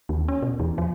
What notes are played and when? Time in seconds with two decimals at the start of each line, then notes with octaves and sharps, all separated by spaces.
0.09 D#2
0.28 C#4
0.42 B2
0.60 E2
0.78 F3